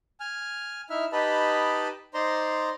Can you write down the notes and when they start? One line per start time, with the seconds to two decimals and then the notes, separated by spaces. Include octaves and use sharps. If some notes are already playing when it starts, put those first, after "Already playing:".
0.20 G#5 F6
0.90 D#4 E4 E5 F6
1.12 D#4 G4 B4 D#5 A5 B5
2.14 D#4 C5 D5 A#5 C6